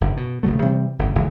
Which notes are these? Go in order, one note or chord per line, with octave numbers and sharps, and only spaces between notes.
F#1 F#2 D3
B2
D#1 C#3 F#3 A3
C3 E3 G3 C4
G1 A2 C#3
F1 C#3 E3 G#3